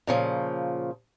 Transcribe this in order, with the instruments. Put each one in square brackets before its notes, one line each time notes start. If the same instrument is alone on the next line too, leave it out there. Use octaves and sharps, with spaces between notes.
[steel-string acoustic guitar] A#2 C#3 F3